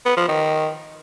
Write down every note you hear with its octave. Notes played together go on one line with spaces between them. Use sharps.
B3
F3
D#3